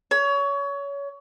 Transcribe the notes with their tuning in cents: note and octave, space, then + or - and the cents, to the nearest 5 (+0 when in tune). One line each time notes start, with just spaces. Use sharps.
C#5 +25